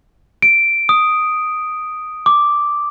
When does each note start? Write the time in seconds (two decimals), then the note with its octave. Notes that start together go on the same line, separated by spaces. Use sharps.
0.42 D7
0.89 D#6
2.26 D6